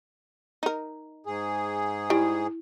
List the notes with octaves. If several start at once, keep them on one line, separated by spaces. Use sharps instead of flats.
D#4 A#4
G#2 G#4
G3 E4